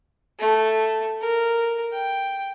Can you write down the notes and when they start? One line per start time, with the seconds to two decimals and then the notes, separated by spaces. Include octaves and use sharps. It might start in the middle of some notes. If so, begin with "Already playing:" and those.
0.39 A3
1.21 A#4
1.92 G5